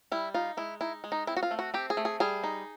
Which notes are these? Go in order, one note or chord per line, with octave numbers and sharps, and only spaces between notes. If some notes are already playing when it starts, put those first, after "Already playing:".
G3 E4
D#4 F4
G#3 E4
D#4 E4
G#3
D#4
C4 E4
F#4
F4
A3
F#4
C4 G4
G#4
A3
G#4
G3 G#4
D#4